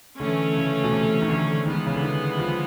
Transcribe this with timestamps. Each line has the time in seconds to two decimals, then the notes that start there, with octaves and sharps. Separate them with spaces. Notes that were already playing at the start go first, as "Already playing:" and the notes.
0.19 D3 E3 A3 C#4
0.57 C#3
0.84 B2
0.92 C3
1.21 D#3
1.30 D3
1.66 D#3 E3 G#3 B3
1.87 C#3
1.94 D3
2.03 D#3
2.39 F3